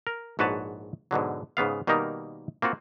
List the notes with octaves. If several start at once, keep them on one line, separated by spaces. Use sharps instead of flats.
A#4
A#1 G#2 F#4 B4 C#5 A5
G#2 B2 D3 F#3
G#2 C#3 B3 F5
B2 D#3 G3 A#3 D#4 A#4
A#3 C4 F4 F#4